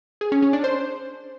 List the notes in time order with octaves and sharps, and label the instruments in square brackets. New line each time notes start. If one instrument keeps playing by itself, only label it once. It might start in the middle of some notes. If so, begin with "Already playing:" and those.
[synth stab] G#4
C#4
C#4
D4
C5